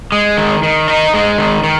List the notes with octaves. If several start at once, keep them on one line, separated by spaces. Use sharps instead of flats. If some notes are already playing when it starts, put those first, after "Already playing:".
G#3
D#3
D#3
D#4
G#3
D#3
D#3